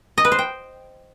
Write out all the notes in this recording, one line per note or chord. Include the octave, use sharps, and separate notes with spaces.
D#5
B4
C5
G5